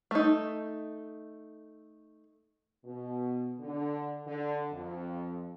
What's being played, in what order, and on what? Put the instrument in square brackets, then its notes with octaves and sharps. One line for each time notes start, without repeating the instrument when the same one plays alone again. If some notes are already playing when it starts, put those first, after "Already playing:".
[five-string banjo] A3 D#4
[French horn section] B2
D3
D3
F2